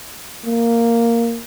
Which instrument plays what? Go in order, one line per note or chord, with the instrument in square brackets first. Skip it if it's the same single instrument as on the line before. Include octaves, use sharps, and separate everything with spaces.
[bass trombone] A#3